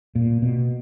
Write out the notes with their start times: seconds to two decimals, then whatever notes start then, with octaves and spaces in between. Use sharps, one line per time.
0.15 A#2
0.42 B2